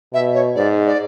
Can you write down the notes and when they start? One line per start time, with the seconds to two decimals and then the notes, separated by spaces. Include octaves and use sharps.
0.13 B2 E5
0.34 C#5
0.55 G#2 D5
0.86 D5